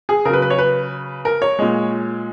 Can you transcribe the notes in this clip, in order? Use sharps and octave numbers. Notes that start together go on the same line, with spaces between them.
G#4
C#3 F#3 A#4 B4
B4
C#5
B4
A#4
C#5
A#2 G#3